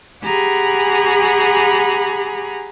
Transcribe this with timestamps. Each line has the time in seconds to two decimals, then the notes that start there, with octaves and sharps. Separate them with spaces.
0.24 G4 G#4 F#5 G#5 A#5 B5